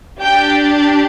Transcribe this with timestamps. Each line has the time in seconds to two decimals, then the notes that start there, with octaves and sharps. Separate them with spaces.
0.21 D4 G4 G5